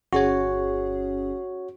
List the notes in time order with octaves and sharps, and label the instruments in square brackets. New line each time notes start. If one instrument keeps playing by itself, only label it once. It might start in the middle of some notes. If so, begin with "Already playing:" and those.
[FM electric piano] G1 C#4 G#4 [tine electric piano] F#4 C#5